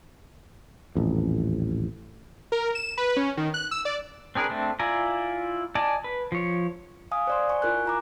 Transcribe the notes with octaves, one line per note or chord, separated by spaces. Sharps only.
D#1 A1 F2
A#4
E7
B4
C#4
D#3
F#6
E6
D5
C4 D4 G#4 A#4 B4
A3 C4 D4
E4 F4 D5 G#5 A#5
D5 D#5 G#5 A5 D6
B4
F3 C#5
F5 G#5 D#6
C5 D5 C6
G#5 C#6
E4 F4 A#4 G#5 F#6
F4 A#5 D6